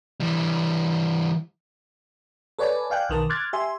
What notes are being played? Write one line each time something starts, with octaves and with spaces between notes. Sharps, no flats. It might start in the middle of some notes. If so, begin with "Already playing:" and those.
E3 G3
A4 B4 C#5 D5 G#5
D5 F5 G5 G#5 F#6
B1 D#3 A#4 A5
C6 D6 F6 F#6 G#6 A6
G4 E5 G#5 C6